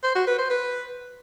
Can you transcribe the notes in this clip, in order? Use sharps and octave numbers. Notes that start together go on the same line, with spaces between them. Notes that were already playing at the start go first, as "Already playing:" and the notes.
C5
F#4
B4
C5
B4